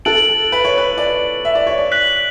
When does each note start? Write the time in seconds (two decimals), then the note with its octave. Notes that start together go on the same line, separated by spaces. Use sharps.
0.05 A4 F#6 A6 D7 F#7
0.52 B4
0.65 C#5
0.78 B4
0.98 D5
1.45 E5
1.55 D5
1.67 C#5
1.78 D5
1.92 F#6 B6 F#7